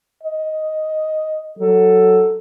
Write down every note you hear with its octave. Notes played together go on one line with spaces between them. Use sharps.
D#5
F#3 A4